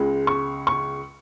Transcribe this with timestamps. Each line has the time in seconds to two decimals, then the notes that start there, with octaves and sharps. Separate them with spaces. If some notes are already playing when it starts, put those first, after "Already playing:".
Already playing: C#2 C#3 G#3
0.27 C#6
0.67 C#6